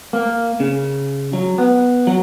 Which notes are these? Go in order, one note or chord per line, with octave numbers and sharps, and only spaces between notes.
A#3
C#3
F#3
B3
F#3